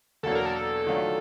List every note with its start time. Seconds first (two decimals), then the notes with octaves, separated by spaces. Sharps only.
0.23 E2 B2 F#3 A#3 D4 A4
0.35 A#4
0.46 A4
0.87 D#3 F#3 A3 D4 F4